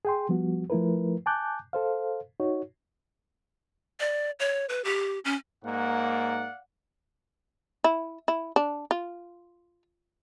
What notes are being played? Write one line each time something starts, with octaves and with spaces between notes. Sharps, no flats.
G#4 G5 C6
F3 G3 B3 F#4
F3 A3 E4 A#4 B4
G#5 A5 D6 F#6 G6
A4 C5 F5
D#4 F#4 C#5
D5
C#5
B4
G4
C#4
G#2 A#3 D5 F5 F#5
E4
E4
D4
F4